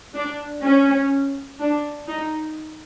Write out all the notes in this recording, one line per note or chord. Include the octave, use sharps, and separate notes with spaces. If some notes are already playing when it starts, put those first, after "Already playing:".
D4
C#4
D4
D#4